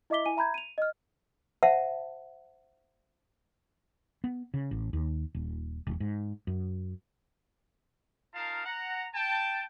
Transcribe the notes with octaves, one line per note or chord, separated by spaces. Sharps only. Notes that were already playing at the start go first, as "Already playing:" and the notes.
E4 D#5 E5 D6 B6 G7
E4 G#5 D#7
E5 A#5 B5 G6 G#6
D#7 F7
D#5 F6
C5 E5 F#5 A5
B3
C#3
A1
D#2
D#1
E1
G#2
F#2
D#4 F4 A#4 F5 A5
F#5 A#5
G5 A5